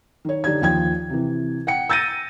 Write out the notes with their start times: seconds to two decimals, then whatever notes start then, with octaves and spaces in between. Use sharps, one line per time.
0.25 D#3 C#5
0.44 D3 D#4 G4 D5 G#6
0.61 D#2 F3 G5 G#6
1.10 C3 E3
1.67 F#5 G5 C#7
1.89 E6 G6 A6 A#6 D#7